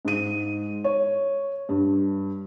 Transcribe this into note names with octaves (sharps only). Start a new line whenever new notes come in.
G#2 D#7
C#5
G2